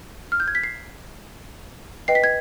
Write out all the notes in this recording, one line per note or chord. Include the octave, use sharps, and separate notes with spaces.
F6
G6
G#6
B6
C7
B4 D#5 G5 C7
B6
G#6